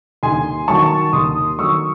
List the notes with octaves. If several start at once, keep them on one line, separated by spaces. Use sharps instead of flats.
D#2 G#5 C6
D#3 F#3 A5 C#6
D#2 C6 D#6
D#3 F#3 C#6 E6